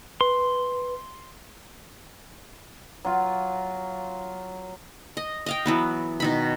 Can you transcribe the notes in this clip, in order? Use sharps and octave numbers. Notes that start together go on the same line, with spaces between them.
B4 C6
F#3 F4
D#5
D#5 F5 G5
E3 F#3 B3
B2 D#3 B5